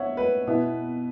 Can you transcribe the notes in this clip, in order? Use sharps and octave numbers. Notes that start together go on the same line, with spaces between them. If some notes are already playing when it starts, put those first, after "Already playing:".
Already playing: B3 C#5 E5 F#5
B4
B2 B3 E4